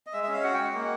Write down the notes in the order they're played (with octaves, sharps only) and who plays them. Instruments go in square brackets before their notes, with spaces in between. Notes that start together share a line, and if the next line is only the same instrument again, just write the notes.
[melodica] D#5
G#3 E5
C#4 E5
F5
F#4 F#5
G5
G#3
F#5
A#3